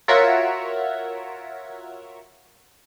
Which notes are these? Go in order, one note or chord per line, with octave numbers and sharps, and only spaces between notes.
F4 F#4 A#4 C#5 E5 F#5